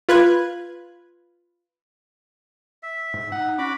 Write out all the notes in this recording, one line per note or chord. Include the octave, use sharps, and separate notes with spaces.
F4 B4 F#6 G#6
E5
G#2
D#4 F#5
C#4 F#4 B5 D6